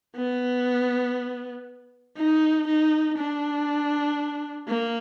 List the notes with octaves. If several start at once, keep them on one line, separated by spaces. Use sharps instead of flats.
B3
D#4
D#4
D4
A#3